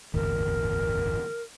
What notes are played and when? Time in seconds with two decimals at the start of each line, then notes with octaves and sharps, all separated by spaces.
0.14 D1 G1 E2 A#4